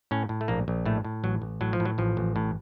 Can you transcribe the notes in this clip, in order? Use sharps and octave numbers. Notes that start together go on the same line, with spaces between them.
A2 C#4
A2
A3
A#1 A#3
A#1
A2 A3
A2
A1 F#3
A1
A2 F#3
F3
A2
F#3
A1 F3
A1
A2